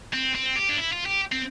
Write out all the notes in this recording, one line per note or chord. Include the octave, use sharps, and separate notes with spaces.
C4
C4
G4
D4
E4
F4
G4
C4